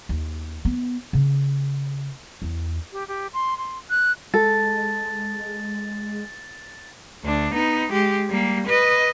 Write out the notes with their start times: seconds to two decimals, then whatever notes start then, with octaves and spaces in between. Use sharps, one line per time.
0.09 D#2
0.65 B3
1.13 C#3
2.42 E2
2.92 G4
3.08 G4
3.34 C6
3.58 C6
3.90 F#6
4.34 G#3 A4 A6
7.24 D2 D4
7.53 B3 D#4
7.92 G#3 G4
8.30 G3 A#3
8.67 B4 D#5